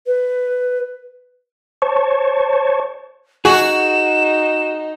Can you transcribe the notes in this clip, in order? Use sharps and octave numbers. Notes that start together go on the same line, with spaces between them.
B4
C5 C#5 A5 C#6
D#4 F#4 G#4 E7